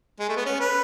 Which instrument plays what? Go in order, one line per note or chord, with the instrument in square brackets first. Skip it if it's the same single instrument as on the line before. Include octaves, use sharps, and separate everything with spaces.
[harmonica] G#3
A3
B3
C#4
B4